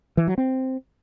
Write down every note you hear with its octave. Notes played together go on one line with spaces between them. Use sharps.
E3
F#3
C4